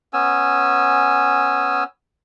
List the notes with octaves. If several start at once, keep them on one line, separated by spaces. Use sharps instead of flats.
B3 C#4 G#5 E6